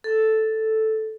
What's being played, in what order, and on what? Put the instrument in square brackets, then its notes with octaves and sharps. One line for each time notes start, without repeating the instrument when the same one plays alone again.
[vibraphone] A4